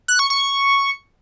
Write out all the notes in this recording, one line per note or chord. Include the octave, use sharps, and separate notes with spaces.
F#6
C#6
C#6